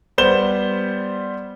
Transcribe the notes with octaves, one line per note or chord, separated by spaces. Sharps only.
G3 B3 C5 E7 G7